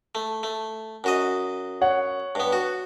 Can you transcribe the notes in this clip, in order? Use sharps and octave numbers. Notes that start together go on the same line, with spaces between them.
A3
A3
F#2 F#4 D#5
C#5 F#5
G2 B3
F#4